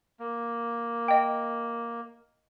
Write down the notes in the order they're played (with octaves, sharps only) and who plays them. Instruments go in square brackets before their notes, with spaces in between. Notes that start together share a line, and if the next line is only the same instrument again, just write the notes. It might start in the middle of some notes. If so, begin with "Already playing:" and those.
[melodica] A#3
[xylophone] D#5 G5